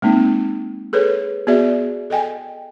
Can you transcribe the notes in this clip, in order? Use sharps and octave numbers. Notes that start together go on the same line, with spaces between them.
G#3 A#3 C4 D#4
G#4 A4 B4 C#5
B3 F#4 G#4 D5 E5
A4 D#5 G5 G#5